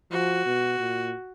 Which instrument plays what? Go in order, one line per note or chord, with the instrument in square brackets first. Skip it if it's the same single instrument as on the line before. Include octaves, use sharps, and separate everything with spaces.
[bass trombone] F3 [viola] F#4
[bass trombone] B2
A#2